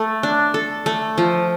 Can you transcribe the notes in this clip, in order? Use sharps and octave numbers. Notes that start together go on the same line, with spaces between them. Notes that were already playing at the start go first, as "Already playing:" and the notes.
Already playing: A3
D4
A4
A3
F3